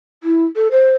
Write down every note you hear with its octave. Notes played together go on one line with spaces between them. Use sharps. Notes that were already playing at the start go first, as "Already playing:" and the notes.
E4
A4
C5